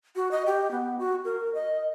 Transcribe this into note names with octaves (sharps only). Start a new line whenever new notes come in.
F#4
D#5
G4
B3
F#4
A#4
D#5